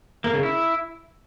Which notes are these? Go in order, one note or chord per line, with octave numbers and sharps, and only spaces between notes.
A#3
C#3
E4